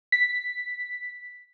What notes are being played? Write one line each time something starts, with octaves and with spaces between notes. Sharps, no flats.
B6